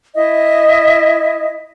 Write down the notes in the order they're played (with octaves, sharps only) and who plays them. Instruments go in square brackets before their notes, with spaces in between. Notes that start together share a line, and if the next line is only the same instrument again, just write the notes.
[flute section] E4 D#5 E5